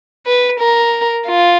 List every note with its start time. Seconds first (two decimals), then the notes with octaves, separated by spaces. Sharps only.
0.26 B4
0.60 A#4
1.27 F4